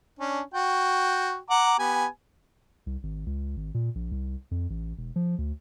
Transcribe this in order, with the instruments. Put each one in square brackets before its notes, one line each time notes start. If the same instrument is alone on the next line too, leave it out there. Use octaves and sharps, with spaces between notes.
[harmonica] C#4 D4
F#4 G5
F#5 A#5 D6
B3 G4 G#5
[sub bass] C2
G#1
C#2
G#1
A#2
A#1
C2
F2
A1
E1
F3
D2